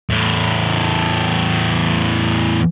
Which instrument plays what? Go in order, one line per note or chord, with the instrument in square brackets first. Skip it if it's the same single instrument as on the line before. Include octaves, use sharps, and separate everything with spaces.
[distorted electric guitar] E2 A2